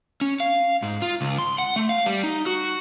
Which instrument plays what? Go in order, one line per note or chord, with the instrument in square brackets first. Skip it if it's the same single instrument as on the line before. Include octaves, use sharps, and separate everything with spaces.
[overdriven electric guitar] C#4
F5
G#2
F4
C#2
C6
F#5
A3
F5
G3
D#4
F#4